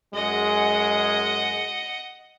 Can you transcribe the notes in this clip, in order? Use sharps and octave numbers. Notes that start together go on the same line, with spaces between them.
F#2 G#3 D#5 F#5